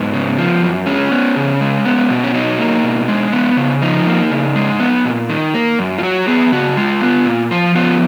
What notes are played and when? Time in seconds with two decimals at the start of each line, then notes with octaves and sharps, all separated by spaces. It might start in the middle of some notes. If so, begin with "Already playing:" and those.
Already playing: G#2 B3
0.13 C#3
0.38 F3
0.63 F#2
0.86 G#3 C#4
1.11 B3
1.36 C#3
1.61 G#3
1.85 B3
2.10 B2
2.24 C#4
2.34 F#3 D#4
2.59 A#3
2.84 B2
3.08 G#3
3.32 B3
3.57 C#3
3.82 F3 D#4
4.06 A#3
4.31 C#3
4.56 G#3
4.80 B3
5.05 A#2
5.30 D#3
5.54 A#3
5.79 F#2
5.98 F4
6.03 F#3 F#4
6.28 B3 G#4
6.52 C#3 F#4
6.77 G#3 F4
7.01 B3
7.26 A#2
7.51 F3 F4
7.75 B3 F4